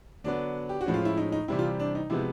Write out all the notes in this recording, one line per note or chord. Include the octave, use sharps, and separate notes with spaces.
D3 F#3 B3 D4
G4
F#4
A2 F3 G#3 C#4
F4
E4
D#4
D#4
C3 E3 G3 C4 E4
F4
D4
D#4
C3 F3 G#3 B3 E4